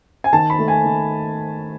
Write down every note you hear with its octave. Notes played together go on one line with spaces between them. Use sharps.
G#5
D#3 A5
B5
A3
G#5
D#3